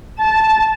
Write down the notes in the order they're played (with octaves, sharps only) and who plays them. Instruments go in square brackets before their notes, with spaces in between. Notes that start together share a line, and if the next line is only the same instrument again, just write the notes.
[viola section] A5